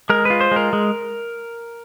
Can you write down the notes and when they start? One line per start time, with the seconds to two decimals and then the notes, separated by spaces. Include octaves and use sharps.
0.10 G#3 A#4
0.25 F4 B4
0.41 C5
0.51 G#3 A#4
0.73 G#3